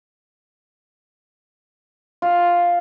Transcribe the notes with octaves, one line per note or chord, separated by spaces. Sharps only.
F4